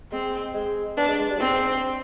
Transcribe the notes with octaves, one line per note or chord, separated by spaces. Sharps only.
G#3 C4
G#3
B3 D4
G#3
G#3
G3
G#2 C4